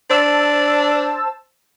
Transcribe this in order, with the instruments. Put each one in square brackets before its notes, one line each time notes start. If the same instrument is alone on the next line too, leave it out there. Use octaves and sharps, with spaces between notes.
[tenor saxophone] D4 [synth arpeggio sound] C5 A5 E6